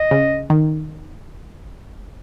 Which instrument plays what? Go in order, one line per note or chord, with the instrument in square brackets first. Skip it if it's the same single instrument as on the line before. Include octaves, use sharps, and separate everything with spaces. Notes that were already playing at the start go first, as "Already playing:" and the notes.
Already playing: [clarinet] D#5
[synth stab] C#3
D#3